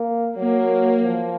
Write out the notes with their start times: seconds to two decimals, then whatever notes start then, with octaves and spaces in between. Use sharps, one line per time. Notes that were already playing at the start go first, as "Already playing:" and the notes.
Already playing: A#3
0.38 F#3 A#3
1.04 F3